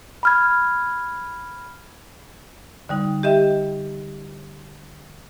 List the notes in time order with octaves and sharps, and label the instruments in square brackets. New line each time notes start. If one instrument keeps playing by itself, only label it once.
[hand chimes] B5 F6 G#6
[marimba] D3 G3 D#4
G4 D#5 E5 G5